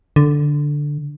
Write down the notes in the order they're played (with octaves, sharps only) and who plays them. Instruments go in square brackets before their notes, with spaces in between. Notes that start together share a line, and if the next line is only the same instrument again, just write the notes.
[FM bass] D3